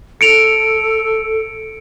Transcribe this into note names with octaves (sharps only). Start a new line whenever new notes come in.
A4 C#7 D7 F7